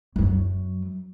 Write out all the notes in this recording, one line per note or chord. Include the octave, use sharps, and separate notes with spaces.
F#2 F#3